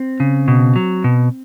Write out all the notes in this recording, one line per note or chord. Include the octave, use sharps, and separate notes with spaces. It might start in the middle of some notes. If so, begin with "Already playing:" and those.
Already playing: C4
C#3
B2
F#3
B2